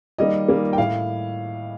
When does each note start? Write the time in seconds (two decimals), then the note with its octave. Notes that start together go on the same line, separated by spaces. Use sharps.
0.18 D#3 G3 A#3 D#5
0.48 D#3 G3 A#3
0.73 G5
0.78 A2 F5